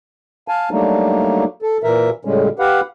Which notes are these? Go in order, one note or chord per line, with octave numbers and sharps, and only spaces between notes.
F5 G#5 A5
F#3 G3 A3 A#3 D4 D#4
A4
A#2 E3 A#4 E5
A2 C#3 G3 G#3 C#4
G4 B4 F5 F#5